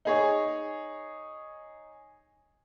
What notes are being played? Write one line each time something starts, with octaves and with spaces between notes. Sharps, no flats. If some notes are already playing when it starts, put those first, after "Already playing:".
D#4 G#4 C#5